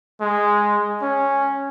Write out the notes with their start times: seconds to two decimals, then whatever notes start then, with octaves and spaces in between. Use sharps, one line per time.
0.21 G#3
1.02 C#4